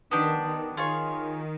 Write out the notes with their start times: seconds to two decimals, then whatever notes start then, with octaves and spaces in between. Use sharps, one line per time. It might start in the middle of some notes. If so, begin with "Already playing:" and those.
0.11 D#3 B3 D4 G4
0.44 D#3
0.77 D#3 F4 G#4 C#5 F5